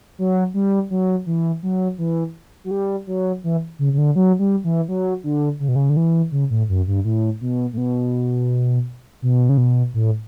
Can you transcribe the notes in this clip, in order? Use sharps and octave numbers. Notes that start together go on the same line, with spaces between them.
F#3
G3
F#3
E3
F#3
E3
F#3
G3
F#3
E3
C#3
C#3
D3
F#3
G3
E3
F#3
D3
C#3
B2
C#3
D3
E3
C#3
A2
F#2
G2
A2
B2
A2
B2
B2
C#3
B2
A2